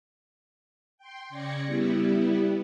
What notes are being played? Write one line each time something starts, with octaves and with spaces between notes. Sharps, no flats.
G5 C6
C#3 D5 G#6 A#6 C#7
G3 B3 E4